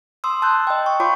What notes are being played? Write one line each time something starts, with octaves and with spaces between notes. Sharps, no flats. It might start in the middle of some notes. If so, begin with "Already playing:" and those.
C6 D#6 E6
A5 C6 D#6 E6 F#6 G6
D#5 G5
C#6
F4 C#5 F5 B5 C6 D6